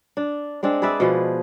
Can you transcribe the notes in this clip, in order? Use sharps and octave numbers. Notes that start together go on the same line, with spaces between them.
D4
G#3 C4 D4
G#4 B4 D5 E5
B2 F3 G#4